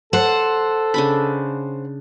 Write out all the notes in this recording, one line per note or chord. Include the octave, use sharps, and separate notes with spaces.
A4 C5 F#5
C#3 D4 B5